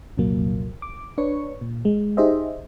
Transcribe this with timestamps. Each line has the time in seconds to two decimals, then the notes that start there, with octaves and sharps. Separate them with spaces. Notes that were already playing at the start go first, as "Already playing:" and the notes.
0.18 C2 F2 A#2 F#3 A#3
0.82 D6
1.18 D4 B4 C#5 C#6
1.61 A#2
1.85 G#3
2.17 D#4 G4 G#4 C5 D#5 E5